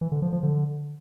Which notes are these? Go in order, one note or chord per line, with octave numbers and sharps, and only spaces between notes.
E3
D3
F3
F3
D3